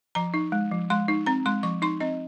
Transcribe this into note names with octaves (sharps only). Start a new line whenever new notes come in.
F3 A#5
D#4
G#3
F3
G#3 C6
D#4
C4 A#5
G#3 C6
F3 C#6
D#4 C6
C4 D#5